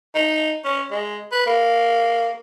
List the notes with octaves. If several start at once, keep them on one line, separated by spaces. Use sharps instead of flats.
D#4
C#4
G#3
B4
A#3